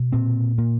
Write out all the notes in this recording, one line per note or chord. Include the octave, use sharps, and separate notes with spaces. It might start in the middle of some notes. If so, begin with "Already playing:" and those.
Already playing: B2
A#2 C4
A#2 A#3